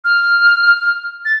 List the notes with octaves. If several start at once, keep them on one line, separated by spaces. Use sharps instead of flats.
F6
A6